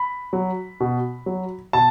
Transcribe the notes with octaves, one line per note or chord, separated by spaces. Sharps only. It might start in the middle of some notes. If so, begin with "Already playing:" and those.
Already playing: B5
F#3
B2
F#3
B2 A5